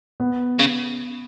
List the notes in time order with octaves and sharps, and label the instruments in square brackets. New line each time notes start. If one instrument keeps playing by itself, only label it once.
[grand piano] B3
[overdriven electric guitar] C#3